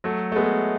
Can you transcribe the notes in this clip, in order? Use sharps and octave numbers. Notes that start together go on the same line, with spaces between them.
F#3 A3
A3
G#3 B3